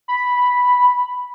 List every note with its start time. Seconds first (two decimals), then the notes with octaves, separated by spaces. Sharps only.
0.08 B5